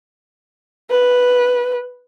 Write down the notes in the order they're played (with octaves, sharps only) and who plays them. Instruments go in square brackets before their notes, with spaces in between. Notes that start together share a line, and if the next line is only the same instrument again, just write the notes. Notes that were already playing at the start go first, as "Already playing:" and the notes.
[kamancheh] B4